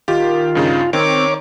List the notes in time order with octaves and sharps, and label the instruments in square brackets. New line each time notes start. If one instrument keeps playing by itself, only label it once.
[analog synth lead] D#3 [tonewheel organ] F4 [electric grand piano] G4
[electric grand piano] G2 C#3 D#4
[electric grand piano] D#3 [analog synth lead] C4 [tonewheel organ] C#5 D6